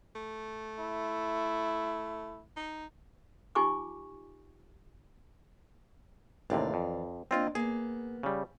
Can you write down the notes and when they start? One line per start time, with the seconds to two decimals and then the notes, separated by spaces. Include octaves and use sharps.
0.15 A3
0.79 E4
2.56 D#4
3.55 D#4 F4 G4 G#5 C#6 D6
6.50 A1 D#2 C3 E3 D5 F5
6.74 F2
7.31 A#3 C4 D4 F4 D#5
7.55 A#3 B3 G#4
8.23 C#3 G3